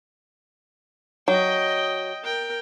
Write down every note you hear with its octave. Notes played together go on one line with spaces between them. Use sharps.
F#3 D#5 G5
A#4 G5